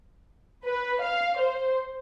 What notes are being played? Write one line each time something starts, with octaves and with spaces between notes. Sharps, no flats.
B4
F5
C5